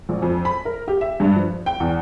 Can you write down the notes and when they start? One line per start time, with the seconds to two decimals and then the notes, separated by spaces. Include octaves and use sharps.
0.09 A#1
0.22 F2
0.45 B5
0.65 A#4
0.88 G4
1.01 E5
1.20 G2
1.36 F3
1.66 G5
1.80 E2